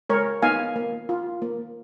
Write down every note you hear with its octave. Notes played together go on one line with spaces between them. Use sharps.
G#3 A#4 C#5
B3 D#4 F5 G#5
A#3
F4
A#3